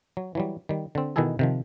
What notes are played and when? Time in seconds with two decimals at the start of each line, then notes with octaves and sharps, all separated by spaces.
0.17 F#3
0.35 E3 F#3 G3
0.69 D#3 G3
0.95 D3 C4
1.16 B2 D#3 E3 E4 G#4 A4
1.39 C3 D#3 F3